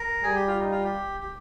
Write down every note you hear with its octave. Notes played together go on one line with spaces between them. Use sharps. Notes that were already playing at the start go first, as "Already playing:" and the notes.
Already playing: A#4
G3 G#4
G4
F4
D#4
F4
G4
G4